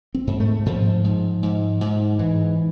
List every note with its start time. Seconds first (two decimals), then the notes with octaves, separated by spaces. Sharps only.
0.15 C4
0.27 G#2
0.40 A3
0.66 G#2 F3
1.04 G#2
1.43 G#2
1.81 G#2
2.19 G#2 E3